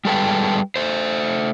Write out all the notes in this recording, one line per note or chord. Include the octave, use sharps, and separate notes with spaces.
G3 G#3 A4 B4 G5
A3 C5